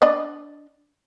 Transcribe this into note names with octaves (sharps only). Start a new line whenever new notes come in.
D4 D5 D#5